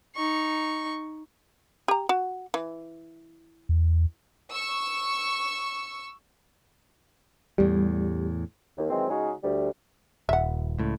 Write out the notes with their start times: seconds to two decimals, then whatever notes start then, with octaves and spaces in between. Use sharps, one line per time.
0.16 D#4 C#6
1.88 G4 A#5
2.09 F#4
2.54 E3
3.69 E2
4.52 C#6 E6
7.58 E2 A2 G3
8.77 D#2
8.90 D#3 E3 F#3 G#3 C4
9.09 C#3 G#3 C#4 D#4 F#4 G#4
9.43 D2 G3
10.29 D#1 E5 F#5
10.78 C#2 A2